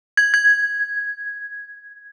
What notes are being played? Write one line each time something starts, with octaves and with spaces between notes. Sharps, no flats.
G#6
G#6